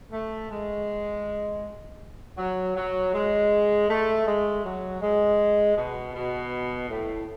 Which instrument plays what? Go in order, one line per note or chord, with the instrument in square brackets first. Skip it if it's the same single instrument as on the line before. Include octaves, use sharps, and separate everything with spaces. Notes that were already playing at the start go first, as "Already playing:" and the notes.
[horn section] A3
G#3
F#3
F#3
G#3
A3
G#3
F#3
G#3
B2
B2
A2